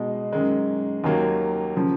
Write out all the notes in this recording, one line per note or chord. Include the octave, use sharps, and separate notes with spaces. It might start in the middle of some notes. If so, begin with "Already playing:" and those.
Already playing: B2 G#3 D#4
F#2 D#3 G#3
D#2 D#3 F#3 A#3
C#3 F3